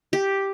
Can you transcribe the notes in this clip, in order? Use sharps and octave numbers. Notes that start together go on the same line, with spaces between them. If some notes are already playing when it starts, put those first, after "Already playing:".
G4